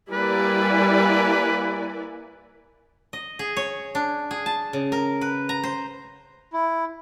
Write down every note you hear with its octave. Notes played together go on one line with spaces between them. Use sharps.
G3 A#3 E4 B4 D5 G#5
D#5
G#4
C#5
D4
G#4
A5
C#3
A#4
B4
A#5
C5
E4